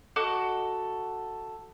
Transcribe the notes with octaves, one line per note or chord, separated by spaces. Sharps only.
F#4 A4 D#5 D6